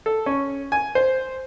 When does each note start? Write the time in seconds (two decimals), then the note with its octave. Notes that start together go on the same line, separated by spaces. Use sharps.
0.06 A4
0.26 C#4
0.72 G#5
0.95 C5